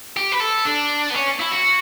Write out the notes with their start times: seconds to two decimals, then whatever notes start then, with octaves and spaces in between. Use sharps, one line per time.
0.17 G4
0.32 B4
0.40 A4
0.65 D4
1.10 B3
1.15 C#4
1.39 E4
1.52 F#4